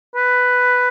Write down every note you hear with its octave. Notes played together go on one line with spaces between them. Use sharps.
B4